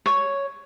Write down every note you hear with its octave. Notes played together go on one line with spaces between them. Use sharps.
C#5